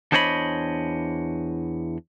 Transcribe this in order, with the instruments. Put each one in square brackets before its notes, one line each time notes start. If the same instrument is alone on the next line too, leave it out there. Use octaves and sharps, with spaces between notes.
[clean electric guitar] E2 D4 C5 C#5 D#5 B5